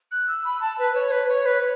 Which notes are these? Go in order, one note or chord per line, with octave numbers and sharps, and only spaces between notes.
F#6
E6
B5
A5
B4
C#5
B4
C#5
B4